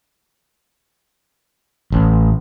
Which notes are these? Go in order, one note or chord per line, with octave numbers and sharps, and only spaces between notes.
A1